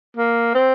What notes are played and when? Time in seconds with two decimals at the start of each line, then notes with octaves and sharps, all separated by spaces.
0.17 A#3
0.54 C4